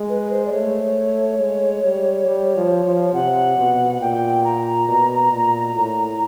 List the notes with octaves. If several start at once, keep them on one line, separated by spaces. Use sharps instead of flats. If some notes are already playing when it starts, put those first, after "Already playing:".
Already playing: G#3
B4
C5
D5
A3 C#5
G#3
G3
G3
F3
F3
C3 F#5
B2
A#2 G5
A#5
B2
A#2
A2